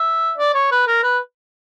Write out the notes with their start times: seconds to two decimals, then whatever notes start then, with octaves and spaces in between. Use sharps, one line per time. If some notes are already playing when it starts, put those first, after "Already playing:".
Already playing: E5
0.38 D5
0.54 C#5
0.71 B4
0.87 A#4
1.03 B4